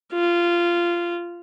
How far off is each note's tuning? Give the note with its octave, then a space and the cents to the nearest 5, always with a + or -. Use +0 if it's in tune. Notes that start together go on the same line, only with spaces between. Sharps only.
F4 -15